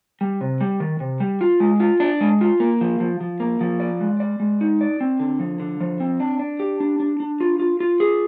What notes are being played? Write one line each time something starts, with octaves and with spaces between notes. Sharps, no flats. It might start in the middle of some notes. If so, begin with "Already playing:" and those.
G3
C3
G3
D#3
C3
G3
F4
G#3
F4
D4
G#3
F4
A#3
F3
F3
F3
A#3
F3
D5
G#3
D5
G#3
D#4
D5
C4
D3
F3
D3
F3
C4
D4
D4
G4
D4
D4
D4
F4
F4
F4
G#4